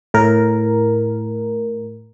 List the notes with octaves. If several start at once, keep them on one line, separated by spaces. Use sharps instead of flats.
A2 A#4